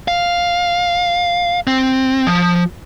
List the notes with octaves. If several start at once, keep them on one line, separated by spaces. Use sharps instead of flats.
F5
C4
F3